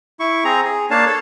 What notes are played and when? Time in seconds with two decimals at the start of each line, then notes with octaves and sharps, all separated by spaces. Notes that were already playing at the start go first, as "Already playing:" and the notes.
0.20 E4 C#6
0.44 C4 G#4 A#5
0.64 G#4
0.91 A#3 D4 C#5 F5 A5
1.06 A4 C#5